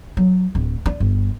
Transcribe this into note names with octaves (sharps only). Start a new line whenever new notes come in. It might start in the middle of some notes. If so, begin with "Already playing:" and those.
F#3
D1
D4
G1